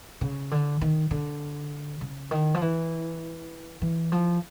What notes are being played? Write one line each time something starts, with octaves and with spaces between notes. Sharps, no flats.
C#3
D3
D#3
D3
C#3
D#3
F3
E3
E3
F3